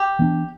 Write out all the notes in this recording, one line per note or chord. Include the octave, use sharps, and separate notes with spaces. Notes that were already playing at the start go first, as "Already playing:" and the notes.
Already playing: G4
E3 B3 D4